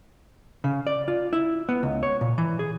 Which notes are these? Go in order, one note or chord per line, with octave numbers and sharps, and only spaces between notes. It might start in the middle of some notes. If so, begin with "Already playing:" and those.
C#3
D5
F4
E4
B3
C#2
C#5
A#2
E3
G#4